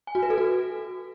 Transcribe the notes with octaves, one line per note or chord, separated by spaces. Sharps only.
G#5
F#4
B4
A4
F#4